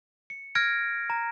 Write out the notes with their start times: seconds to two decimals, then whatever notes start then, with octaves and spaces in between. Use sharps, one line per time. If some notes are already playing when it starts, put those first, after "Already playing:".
0.30 C#7
0.55 F6 G#6 A#6 D7
1.10 A#5